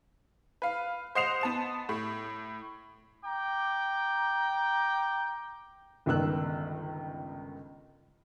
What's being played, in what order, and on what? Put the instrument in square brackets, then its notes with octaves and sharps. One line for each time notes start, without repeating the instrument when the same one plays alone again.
[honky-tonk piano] B4 F5
C5 D#5 F#5 C7 E7 F7
B3 A5 E7
A2
[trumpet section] G5 A#5 D6
[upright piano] G1 C#2 D#3 E6 F#6